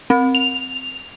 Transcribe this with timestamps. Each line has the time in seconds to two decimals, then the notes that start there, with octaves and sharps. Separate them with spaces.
0.10 C4
0.35 F7